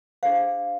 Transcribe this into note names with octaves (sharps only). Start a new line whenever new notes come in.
D4 G#4 C5 F5